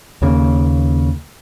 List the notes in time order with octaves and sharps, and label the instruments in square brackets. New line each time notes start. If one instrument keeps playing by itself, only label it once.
[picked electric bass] D#2 C#3 A#3